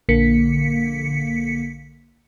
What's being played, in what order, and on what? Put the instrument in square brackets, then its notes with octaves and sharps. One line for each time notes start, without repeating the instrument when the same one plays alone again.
[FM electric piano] A#1 D3 A#3 B6 C#7